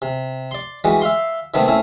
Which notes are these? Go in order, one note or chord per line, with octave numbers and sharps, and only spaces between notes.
C3
D5 C6
E3 G3 G#3 F#4
E5 F5 C6
C3 D#3 G3 A3 B3 C4
A3 C4 C#4 E4